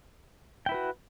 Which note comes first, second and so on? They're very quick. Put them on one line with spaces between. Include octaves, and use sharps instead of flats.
G5 E4 B4 F#4